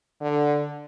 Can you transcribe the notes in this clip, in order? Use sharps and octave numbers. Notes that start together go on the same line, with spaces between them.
D3